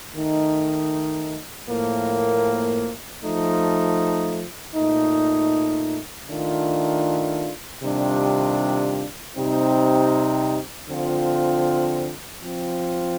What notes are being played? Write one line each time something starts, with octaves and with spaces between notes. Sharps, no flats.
D#3 A3 D#4
A2 F3 A#3
F3 A3 D#4
A#2 A3 D#4
D#3 A3 D4 F4
C3 D#3 G3 D4 F4
C3 G3 C4 D#4
D3 F3 C4 F4
F3 C4 F4